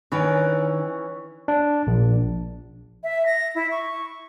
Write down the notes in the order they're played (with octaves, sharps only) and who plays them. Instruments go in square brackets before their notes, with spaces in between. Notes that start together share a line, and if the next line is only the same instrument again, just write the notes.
[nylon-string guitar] D#3 D4 B4 [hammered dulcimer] E3 C#4
[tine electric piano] D4
A#1
[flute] E5
A#6
E4
C#6